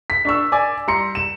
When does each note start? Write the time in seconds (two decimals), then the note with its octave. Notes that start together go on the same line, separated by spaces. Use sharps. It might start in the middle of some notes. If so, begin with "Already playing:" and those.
0.10 B6
0.25 D4 C#6 E6
0.52 D5 G#5 D6
0.87 G3 A#5 C6 C#7
1.15 E7